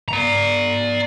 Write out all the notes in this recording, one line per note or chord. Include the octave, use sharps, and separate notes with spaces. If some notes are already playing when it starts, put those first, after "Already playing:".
D5 A#5